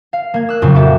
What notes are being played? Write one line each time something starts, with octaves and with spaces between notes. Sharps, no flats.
F5
A#3 G#6
E6 F#6
F2 A#2 C#3 F#3
F#4 G4 A4 E5